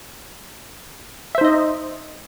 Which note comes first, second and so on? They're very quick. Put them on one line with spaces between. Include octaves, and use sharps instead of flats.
E5 C5 D#4 D#5